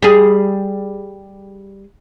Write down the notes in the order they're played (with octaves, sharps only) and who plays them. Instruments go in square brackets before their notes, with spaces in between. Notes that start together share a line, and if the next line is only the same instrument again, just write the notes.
[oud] G3 G#4